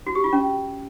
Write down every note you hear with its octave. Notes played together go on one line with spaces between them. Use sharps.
F#4
G4
F4
C#4